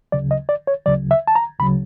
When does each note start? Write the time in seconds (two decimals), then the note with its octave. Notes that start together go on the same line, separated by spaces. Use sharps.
0.12 D2 C#3 F#3 D5
0.31 D#5
0.49 D5
0.67 C#5
0.86 D2 C#3 F#3 D5
1.11 E5
1.27 A5
1.35 A#5
1.59 D2 C#3 F#3 B5